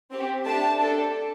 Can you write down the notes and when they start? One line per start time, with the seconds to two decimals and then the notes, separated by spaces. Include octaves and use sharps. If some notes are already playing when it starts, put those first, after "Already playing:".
0.11 C4 G4
0.45 A3 D4 G4 A5
0.78 D4 A4